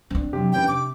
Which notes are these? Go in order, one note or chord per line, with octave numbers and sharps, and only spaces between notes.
C4 D4
C3 F3 F#3 G4
E3 C#4 B4 G5
C3 D6